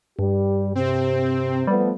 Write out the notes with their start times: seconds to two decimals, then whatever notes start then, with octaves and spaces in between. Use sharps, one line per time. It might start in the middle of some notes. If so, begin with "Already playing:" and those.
0.19 G2 G3 G4
0.75 C3 C4
1.67 F3 G3 A3 B3